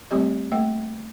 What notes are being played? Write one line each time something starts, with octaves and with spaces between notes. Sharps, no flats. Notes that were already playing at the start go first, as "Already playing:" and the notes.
G3 A3 C4 G4 D#5
A3 A#3 G5